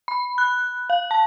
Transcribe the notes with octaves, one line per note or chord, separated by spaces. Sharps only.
B5
F#6
F5
A5